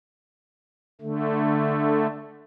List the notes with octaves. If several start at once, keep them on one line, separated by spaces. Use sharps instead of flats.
D3 A3